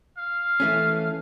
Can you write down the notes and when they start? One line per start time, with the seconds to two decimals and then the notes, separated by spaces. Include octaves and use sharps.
0.18 F5
0.60 E3 A3 C#4